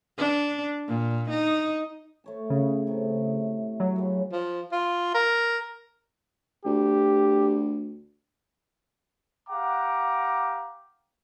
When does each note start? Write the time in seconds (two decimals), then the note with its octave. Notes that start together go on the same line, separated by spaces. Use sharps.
0.18 D4
0.88 A#2
1.29 D#4
2.24 A3 C#5 A5
2.50 C#3
2.87 A2 C3
3.80 F#3
3.96 F#2 C#3
4.32 F3
4.72 F4
5.15 A#4
6.65 D2 G4
9.49 G4 F5 F#5 A#5 D6